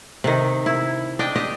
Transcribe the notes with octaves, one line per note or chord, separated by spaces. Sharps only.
C3 D#3
E4
D4 D#5 G5
G4 D#5